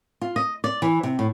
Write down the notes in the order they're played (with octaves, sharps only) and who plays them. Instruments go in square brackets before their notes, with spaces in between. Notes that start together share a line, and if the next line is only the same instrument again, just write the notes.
[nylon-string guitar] F4
D#5
D5
E3
C3
A2